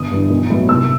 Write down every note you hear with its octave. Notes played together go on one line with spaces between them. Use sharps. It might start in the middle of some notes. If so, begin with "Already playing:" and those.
Already playing: G1 D#6
G2 E3
B1
A2 F#3 B3
C2 E6